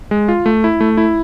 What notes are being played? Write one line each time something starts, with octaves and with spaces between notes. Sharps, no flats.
G#3
F4
A3
E4
A3
E4